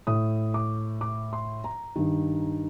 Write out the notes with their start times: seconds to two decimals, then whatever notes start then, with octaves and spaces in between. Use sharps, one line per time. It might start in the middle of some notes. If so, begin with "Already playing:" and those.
0.07 A2 D#6
0.54 D6
1.01 D6
1.33 C6
1.64 A#5
1.96 G2 D#3